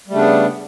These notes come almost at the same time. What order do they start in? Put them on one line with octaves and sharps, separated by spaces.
G3 A3 C#3 D4 B3